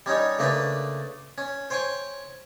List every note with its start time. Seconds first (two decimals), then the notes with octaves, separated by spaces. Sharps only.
0.06 G3 C#4 D#4 C#5
0.39 C#3 A3 A#3 D4 B4
1.38 C#4
1.70 C5 C#5 G5 G#5 C#6